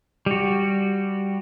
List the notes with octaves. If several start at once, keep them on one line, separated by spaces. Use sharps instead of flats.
G3 F#4